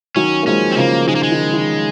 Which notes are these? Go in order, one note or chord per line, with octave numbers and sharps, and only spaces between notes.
D#3 F#3 C#4
A#3
F3 G#3 C#4
C4
C#3 F3 A#3
D#3 G#3
A#3
G#3
D#3
D#3